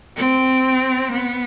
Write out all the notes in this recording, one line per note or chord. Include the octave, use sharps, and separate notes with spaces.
C4
B3